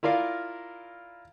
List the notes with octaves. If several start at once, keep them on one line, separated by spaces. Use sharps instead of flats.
E4 F4 A#4 D5 F5